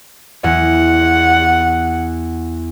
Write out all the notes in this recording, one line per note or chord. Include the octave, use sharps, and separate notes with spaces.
E2 F#5